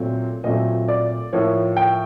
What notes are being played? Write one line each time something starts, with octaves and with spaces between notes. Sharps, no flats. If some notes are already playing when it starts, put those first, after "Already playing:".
Already playing: A#2 F#3 A3 C4
A#2 F#3 A3 C4 D#5
D5
A2 F3 A#3 C#5
G5